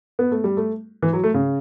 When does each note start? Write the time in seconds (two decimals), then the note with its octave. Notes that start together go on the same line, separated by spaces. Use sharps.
0.19 B3
0.31 A3
0.44 G3
0.57 A3
1.02 E3
1.13 F#3
1.24 A3
1.34 C#3